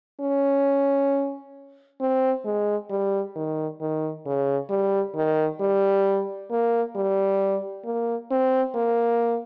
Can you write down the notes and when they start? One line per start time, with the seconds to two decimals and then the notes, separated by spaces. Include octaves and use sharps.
0.20 C#4
2.00 C4
2.45 G#3
2.90 G3
3.36 D#3
3.81 D#3
4.26 C#3
4.70 G3
5.15 D#3
5.61 G3
6.51 A#3
6.96 G3
7.85 A#3
8.31 C4
8.75 A#3